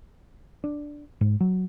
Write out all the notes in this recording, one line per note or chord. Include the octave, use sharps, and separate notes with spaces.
D4
G#2
F#3